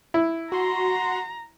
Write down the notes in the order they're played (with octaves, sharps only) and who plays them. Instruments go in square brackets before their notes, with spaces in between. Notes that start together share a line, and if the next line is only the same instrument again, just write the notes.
[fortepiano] E4
[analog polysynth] F#4 C6 [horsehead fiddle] A#5